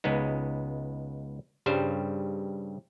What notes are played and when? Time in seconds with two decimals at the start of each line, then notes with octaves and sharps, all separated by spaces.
0.04 C#2 G#3 B3 D#4
1.66 G2 C#3 G3 C5